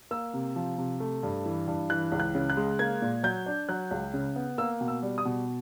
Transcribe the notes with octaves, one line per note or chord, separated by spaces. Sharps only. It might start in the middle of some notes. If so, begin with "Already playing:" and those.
A#3 E6
C3
F3
C3
A3
G2
E3
G2
E3 F#6
C#2
F#6
C#3
F#6
G#3
A#3 G#6
A#2
F#3 G6
D4
F#3 F#6
C#2
C#3
B3
A#3 E6
B2
E6
G3
D#6
B2